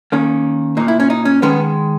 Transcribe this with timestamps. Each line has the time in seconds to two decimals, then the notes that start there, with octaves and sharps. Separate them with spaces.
0.12 D#3 A#3 C#4
0.77 A#2 A#3 D#4
0.88 E4
1.00 C#4
1.10 D#4
1.25 C#4
1.42 D#3 G#3 B3 C#4